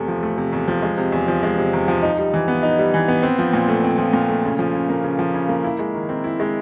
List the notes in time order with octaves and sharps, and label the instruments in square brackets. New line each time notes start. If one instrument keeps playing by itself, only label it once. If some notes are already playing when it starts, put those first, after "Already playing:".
Already playing: [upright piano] E2 C3 A3
F3
A3
C3
E2
F3
G#3
C3
E2
F3
G#3
C3
E2
F3
D#4
G3
E3
B3
D#4
G3
E3
B3
C4
F3
A#2
A3
C4
F3
A#2
A3
C#3
F3
C#3
A#3
C#3
F3
C#3
A#3
E4
G#3
D#3
C4
E4
G#3